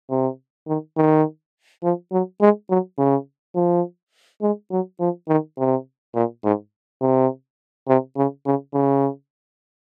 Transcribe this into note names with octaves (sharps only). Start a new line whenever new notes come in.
C3
D#3
D#3
F3
F#3
G#3
F#3
C#3
F3
G#3
F#3
F3
D#3
C3
A#2
G#2
C3
C3
C#3
C#3
C#3